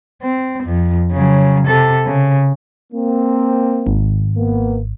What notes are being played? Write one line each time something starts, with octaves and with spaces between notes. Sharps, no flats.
C4
F2
C#3 F#3
C3 A4
C#3
A#3 C4
G#1
A#3 B3